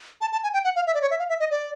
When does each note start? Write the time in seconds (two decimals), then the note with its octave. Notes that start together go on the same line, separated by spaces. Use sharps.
0.21 A5
0.32 A5
0.43 G#5
0.54 G5
0.64 F#5
0.76 F5
0.87 E5
0.94 D5
1.02 C#5
1.11 E5
1.19 F5
1.29 E5
1.40 D#5
1.51 D5